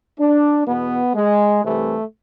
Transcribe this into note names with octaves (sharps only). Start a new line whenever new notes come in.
D4
E2 B2 B3
G#3
C2 C3 E3 A3